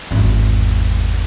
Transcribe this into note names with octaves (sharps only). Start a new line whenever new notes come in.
G#1 E2